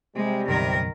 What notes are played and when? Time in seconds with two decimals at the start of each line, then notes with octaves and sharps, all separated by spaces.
0.16 C3 G3 G#3
0.49 F#1 B1 D#3 A#4